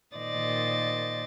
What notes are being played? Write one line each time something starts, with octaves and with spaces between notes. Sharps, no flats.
A#2 D#3 C5 D5 D#5 A6